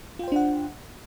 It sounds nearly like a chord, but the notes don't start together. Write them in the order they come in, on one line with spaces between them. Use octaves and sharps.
F4 G5 C5 D4 F#5